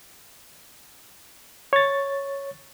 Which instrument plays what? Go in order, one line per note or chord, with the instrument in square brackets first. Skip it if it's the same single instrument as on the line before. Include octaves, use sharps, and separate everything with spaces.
[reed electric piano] C#5 A6